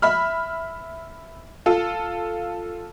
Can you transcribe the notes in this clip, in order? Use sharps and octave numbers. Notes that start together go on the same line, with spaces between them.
E5 B5 F6
F4 A4